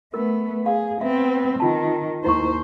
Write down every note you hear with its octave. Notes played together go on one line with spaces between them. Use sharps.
A3 B3 A#4
G#4 F5
B3 C4 E5
D#3 F4 A5
D#2 D#4 E4 C5 C#6